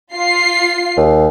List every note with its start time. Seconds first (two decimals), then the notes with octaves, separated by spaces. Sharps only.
0.14 F4 C7
0.97 D#2